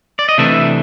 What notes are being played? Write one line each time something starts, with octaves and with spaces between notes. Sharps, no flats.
D5
D#5
C3 E3 A3 D4 E5